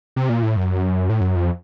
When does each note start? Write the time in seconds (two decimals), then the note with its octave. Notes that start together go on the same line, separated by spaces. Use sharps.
0.16 C3
0.29 A#2
0.43 A2
0.57 F#2
1.09 A2
1.21 F#2
1.36 F2